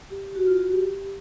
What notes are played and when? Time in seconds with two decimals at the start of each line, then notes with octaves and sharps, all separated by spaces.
0.10 G4
0.35 F#4
0.46 F4
0.57 F#4
0.72 G4